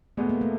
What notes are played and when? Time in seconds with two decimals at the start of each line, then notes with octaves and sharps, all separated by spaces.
0.17 E2 B2 G#3 A3 B3
0.29 A#3
0.41 A3